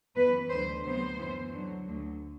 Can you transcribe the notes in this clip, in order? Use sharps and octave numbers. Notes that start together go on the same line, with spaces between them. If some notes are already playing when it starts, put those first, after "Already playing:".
F#2 E3 B3 B4
D2 D3 F#3 C5
D2 C3 F#3 B3 C5
F#2 E3 B3
D2 D3 F#3
D2 D3 F#3